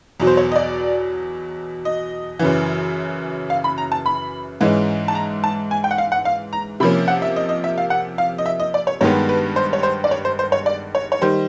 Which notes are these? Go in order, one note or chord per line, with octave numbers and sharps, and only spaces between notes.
E2 B2 F#3
C5
C#5
D#5
D5
D#5
F#2 C#3 E3
F5
B5
A#5
A5
B5
G#2 E3 G#3 C#4
A5
A#5
A5
G#5
G5
F#5
F5
F#5
F5
A#5
C3 F3 A#3 C#4 B5
F#5
E5
D#5
D#5
E5
F5
F#5
F5
D#5
E5
D#5
D5
C#5
G2 D#3 G#3 B3 C#5
B4
C5
C#5
C5
D5
C#5
C5
C5
C#5
D5
C#5
C#5
D#3 G3 C5